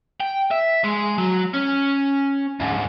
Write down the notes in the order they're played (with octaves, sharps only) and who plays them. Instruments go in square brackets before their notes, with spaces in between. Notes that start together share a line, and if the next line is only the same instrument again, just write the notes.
[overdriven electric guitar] G5
E5
G#3
F#3
C#4
D2 G#2